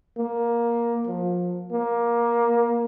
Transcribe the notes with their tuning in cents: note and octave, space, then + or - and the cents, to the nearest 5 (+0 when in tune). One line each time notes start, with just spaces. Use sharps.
A#3 +10
F3 +30
A#3 +15